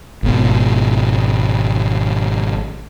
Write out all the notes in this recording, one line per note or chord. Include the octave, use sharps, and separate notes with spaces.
G#1 B2